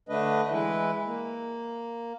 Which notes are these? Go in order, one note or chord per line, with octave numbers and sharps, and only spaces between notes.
D3 A3 D4 B4 D#5
E3 G#3 E4 B4
A#3